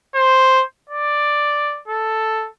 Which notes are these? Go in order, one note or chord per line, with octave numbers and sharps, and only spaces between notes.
C5
D5
A4